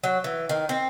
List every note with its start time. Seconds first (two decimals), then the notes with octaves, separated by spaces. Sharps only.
0.04 F#3
0.24 E3
0.49 D#3
0.69 C4